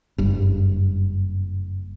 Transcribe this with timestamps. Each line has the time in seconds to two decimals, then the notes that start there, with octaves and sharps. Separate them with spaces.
0.18 F#1 G2